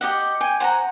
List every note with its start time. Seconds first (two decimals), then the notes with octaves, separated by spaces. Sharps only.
0.01 G4 D#5 F#5
0.41 G5 G#5
0.60 C5 F#5 G#5 A#5